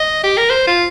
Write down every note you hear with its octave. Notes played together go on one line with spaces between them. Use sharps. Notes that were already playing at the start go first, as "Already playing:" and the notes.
Already playing: D#5
G4
A#4
C5
F4